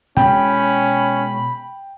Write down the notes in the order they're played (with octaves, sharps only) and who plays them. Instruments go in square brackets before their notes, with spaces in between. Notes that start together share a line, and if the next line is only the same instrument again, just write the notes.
[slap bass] B2 G#3 [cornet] C#4 [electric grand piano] G5 [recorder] B5